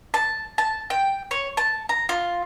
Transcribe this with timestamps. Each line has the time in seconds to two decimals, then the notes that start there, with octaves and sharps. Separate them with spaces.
0.14 A5
0.58 A5
0.90 G5
1.31 C#5
1.57 A5
1.89 A#5
2.09 F4